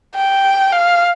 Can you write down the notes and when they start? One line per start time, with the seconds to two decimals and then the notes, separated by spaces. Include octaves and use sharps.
0.15 G5
0.73 F5